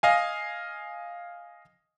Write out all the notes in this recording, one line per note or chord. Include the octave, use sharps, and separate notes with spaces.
D#5 F5 G#5